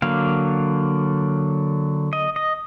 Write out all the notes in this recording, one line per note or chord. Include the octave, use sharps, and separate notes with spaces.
D3 F#3 A#3 F5
D#5
D#5